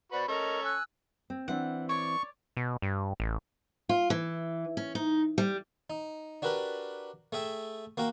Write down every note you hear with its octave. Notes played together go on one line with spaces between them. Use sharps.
F#4 B4 C5 D5 F#5 B5
C#4 A4 A#4 D#5 A#5 C#6
G#5 E6 F#6
C4
E3 C4 D4 F#5
C#5 D5 C#6
B2
G2
A1
F4
E3
C#4
D#4
G3
D#4
D4 F#4 G4 A#4 B4
A3 G#4 E5 G5
A#3 F#4 A#4 G5